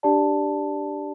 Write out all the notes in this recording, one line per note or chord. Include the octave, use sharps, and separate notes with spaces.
D4 G4 D5 A5